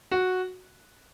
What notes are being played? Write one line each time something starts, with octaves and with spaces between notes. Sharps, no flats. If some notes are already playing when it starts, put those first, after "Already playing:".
F#4